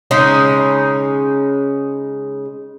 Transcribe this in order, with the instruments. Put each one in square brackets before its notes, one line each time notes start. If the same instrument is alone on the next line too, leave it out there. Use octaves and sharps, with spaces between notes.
[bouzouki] C#3 G#3 C#4 D#4